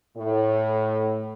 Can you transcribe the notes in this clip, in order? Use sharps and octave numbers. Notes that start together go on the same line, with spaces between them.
A2